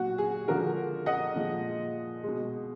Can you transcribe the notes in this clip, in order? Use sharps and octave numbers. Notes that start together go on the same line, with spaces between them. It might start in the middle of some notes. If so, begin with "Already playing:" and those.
Already playing: A#2 F#3 F#4
G#4
D3 F3 G#3 F#4 A#4
D#5 F#5
A#2 F3 G#3
B2 G#3